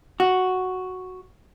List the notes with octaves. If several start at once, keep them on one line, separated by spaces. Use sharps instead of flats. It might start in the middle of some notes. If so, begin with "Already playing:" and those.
F#4